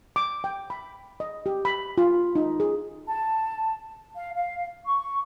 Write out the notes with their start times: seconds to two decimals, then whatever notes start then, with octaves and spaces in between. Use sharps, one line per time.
0.16 D6
0.44 G5
0.70 B5
1.20 D#5
1.46 G4
1.65 B5
1.98 F4
2.35 D#4
2.60 G#4
3.07 A5
4.16 F5
4.36 F5
4.87 C#6